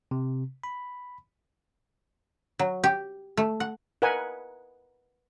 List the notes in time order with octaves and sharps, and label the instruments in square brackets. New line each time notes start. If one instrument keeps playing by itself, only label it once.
[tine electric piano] C3
B5
[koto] F#3
G4
A3
F#5
[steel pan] A#4 B4 D#5 F#5 G#5